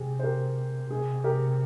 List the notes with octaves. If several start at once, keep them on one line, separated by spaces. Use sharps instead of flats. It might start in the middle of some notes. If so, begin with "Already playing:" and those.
Already playing: C3 G4 G#4
C5
G4 A#4
C3 G#4
G4 A#4